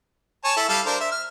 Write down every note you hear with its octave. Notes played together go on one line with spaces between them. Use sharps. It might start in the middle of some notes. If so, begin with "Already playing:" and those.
C#5 G#5 A5
E4 A4
G3 A4 F5
D4 A#4 C5
E5
F6